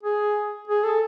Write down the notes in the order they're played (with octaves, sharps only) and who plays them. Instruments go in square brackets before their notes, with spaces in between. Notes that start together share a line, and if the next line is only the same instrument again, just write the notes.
[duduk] G#4
G#4
A4